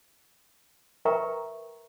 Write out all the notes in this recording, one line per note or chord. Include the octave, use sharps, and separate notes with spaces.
A#4 B4 E5 G5 A#5 C#6